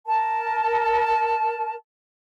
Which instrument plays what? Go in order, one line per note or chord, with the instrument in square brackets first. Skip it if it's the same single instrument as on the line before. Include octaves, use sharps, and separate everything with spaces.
[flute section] A#4 A5